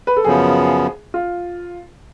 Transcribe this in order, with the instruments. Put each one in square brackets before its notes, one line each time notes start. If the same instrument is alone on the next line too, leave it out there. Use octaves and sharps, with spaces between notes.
[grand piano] B4
A4
[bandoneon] F#2 C#3 F3 B3 [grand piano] G#4
[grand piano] F4